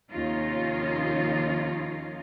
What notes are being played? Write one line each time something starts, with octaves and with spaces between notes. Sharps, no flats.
D#2 C3 F3 C#4 D#4 F4